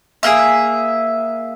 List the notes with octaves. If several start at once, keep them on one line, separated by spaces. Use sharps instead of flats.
A#3 D#4 G#4 E5